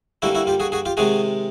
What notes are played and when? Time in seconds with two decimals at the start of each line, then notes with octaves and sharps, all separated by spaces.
0.22 D3 G3 A#3 E4 F#4
0.35 E4 F#4
0.47 F4 G4
0.60 F#4 G#4
0.72 F#4 G#4
0.86 F4 G4
0.97 C3 D#3 G#3 F#4 G#4